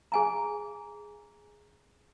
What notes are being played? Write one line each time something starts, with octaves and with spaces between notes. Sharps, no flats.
G#4 G#5 A#5